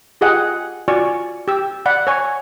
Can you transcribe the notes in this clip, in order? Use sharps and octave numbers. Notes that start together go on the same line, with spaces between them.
F4 G4 G#4 D#5 F#5
F4 F#4 D5 G#5 C#6
G4 E6
D5 F#5 B5
C#5 G#5 C#6